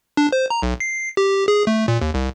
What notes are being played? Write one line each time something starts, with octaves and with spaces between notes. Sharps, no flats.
D4
C5
A#5
B1
C7
G4
G#4
A3
A#2
D#2
C2